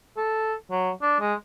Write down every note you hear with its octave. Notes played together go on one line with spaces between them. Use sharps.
A4
F#3
D4
G#3